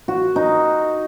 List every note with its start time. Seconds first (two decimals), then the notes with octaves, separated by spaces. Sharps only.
0.08 F#4
0.36 D#4